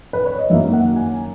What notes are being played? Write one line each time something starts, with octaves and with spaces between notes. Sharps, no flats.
B4
C#5
D#5
F#2 D#3 F#3 A#3 E5
F#5
G#5